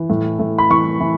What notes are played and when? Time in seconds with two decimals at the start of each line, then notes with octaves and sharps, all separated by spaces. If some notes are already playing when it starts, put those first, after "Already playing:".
Already playing: E3
0.10 A2
0.39 A2
0.58 B5
0.70 E3 C#6
1.00 E3